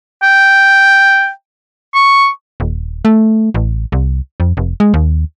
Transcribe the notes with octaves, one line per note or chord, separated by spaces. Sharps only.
G5
C#6
D#1
A3
A1
C2
F2
F1
G#3
D#2